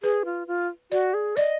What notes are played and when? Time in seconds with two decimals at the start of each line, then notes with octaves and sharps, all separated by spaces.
0.03 G#4 B4
0.25 F4
0.47 F4
0.91 F#4 D5
1.14 G#4
1.36 D5 D#5